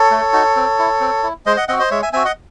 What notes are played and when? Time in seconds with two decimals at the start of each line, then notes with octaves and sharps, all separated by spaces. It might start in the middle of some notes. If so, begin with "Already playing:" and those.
Already playing: A4 C#5
0.11 A3
0.33 D#4 F#4
0.56 C4
0.79 E4
1.00 C4
1.23 E4
1.46 G#3 C5 D#5
1.57 D#5 F#5
1.68 C4 D#5 F#5
1.73 F#4
1.79 C5 D#5
1.91 G#3 C#5 E5
2.02 E5 G#5
2.13 C4 F#4 E5 G#5
2.25 D#5 F#5